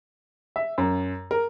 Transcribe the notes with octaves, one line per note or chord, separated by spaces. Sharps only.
E5
F#2
A#4